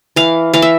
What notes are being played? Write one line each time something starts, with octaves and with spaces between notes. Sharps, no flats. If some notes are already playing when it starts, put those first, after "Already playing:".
E3 F5
E3 F5
E5